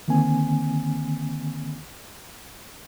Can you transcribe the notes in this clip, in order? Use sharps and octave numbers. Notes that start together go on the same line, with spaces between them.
D3 D#3 A#3 C4 G#5